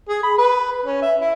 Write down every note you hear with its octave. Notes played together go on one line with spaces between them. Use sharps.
G#4
B5
B4
C#4
E5
E4